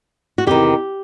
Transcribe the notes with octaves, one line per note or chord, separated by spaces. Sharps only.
F#4
E2 C3 D#3 G4